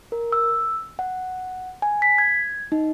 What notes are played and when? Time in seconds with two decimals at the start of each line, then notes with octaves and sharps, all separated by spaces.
0.12 A#4
0.32 E6
0.99 F#5
1.82 G#5
2.02 B6
2.18 G#6
2.72 D#4